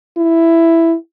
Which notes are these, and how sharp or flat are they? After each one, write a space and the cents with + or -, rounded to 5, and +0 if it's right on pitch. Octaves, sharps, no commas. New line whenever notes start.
E4 +5